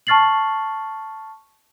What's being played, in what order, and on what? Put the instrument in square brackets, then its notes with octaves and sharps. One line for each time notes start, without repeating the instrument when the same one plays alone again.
[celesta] A5 C#6 F6 A6 C7 F#7